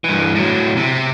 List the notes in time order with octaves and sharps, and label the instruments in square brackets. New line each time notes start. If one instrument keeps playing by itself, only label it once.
[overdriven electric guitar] G2 E3
A2 F#3
C3